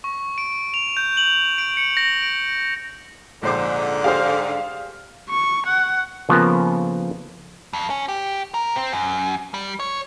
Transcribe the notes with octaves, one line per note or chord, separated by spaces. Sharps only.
C#6
D7
F7
G6
F#7
D7
C#7
A#6
D7
A#1 G#2 D3 C5 D6
G4 G#4 C5 F5 F6
C#6
F#5
C#3 F3 A#3 B3 A4 A#4
F2
C#4
G4
A#4
C4
F#2
G3
C#5